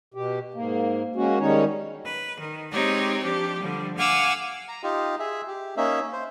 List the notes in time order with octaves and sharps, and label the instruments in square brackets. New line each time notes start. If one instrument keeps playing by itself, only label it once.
[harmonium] B2 G4
G#2 A#3
G#3 A#3 C#4 F#4
D#3 G3 G#3 C#4 D#4 C#5
[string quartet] B4
D#3
G#3 C4 D#4 G4 C#5 D5
F3 D4 G4
D3 F3 G3
F5 F#5 G#5 D6 E6 F6
[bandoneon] A#5
D#4 F4 G4
G#4 E5
G4
A#3 C#4 D#4 E5
C5